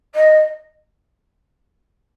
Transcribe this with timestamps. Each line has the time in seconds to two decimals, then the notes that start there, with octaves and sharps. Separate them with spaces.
0.15 D#5